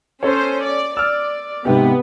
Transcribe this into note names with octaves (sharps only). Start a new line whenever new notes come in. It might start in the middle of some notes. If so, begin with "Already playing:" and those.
C#4 A4 C5 C#5
D5
D5 E6 F6
G#2 C3 B3 G4